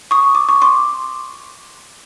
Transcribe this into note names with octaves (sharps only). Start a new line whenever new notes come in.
C#6 D#6
D6
C#6
C6 D6